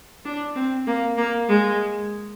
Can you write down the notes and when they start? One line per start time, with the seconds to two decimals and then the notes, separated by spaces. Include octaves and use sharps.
0.25 D4
0.55 C4
0.87 A#3
1.17 A#3
1.49 G#3